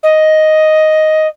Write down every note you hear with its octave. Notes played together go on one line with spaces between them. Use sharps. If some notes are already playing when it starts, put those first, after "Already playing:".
D#5